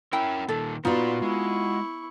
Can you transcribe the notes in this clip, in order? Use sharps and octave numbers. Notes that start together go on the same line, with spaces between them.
C#4 E4 A#4 G5
A#2 D#3 A4
A#2 B3 D#4 F4 F#4 D5 C6
G#3 E4 C#6